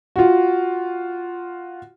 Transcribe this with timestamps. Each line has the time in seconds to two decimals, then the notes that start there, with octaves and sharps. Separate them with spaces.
0.16 F4 F#4